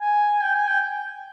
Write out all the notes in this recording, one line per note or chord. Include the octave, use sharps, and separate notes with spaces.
G#5
G5
G#5
G5